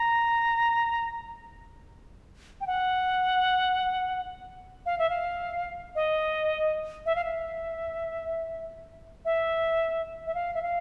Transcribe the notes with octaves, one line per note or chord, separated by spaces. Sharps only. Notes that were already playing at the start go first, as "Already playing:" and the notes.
Already playing: A#5
G5
F#5
F5
E5
F5
D#5
E5
F5
E5
E5
E5
F5
E5
F5